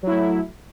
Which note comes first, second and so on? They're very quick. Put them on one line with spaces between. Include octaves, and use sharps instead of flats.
F#3 E4 A3